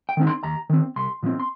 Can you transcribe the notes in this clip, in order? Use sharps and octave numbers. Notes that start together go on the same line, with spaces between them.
G5
D#3 C4 D#4
C6
D#2 A#5
D#3 C4
C2 C6
A#2 F3 C4
C6